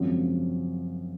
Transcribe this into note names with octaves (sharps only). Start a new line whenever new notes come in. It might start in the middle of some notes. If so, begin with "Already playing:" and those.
Already playing: G#1 F#2 C#3 F3